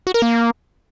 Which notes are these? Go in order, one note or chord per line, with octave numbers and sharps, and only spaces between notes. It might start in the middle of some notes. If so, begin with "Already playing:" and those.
F#4
A#4
A#3